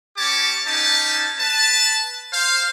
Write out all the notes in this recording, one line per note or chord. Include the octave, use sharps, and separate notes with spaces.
C#4 G4 C#5 A5 D6
C#4 D#4 G4 A5
B4 A5
C5 F5